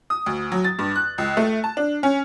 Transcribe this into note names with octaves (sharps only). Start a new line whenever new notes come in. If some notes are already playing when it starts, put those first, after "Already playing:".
D#6
D2
F#3
A6
G2
F#6
C#2
A3
A5
D4
C#4